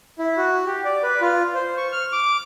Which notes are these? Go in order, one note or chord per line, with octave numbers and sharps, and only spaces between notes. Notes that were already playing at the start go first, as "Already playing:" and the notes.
E4
F#4
G4
D5
B4
F4
C5
C#6
F6
D6